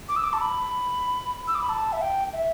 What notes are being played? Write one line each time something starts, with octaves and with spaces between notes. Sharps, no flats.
D6
E6
D6
A5
B5
E6
D6
B5
A5
E5
G5
E5